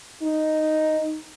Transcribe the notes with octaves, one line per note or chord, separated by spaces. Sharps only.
D#4